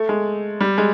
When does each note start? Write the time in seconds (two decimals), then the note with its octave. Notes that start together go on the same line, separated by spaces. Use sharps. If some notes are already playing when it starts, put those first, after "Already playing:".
Already playing: A3
0.09 G#3
0.61 G3
0.78 G#3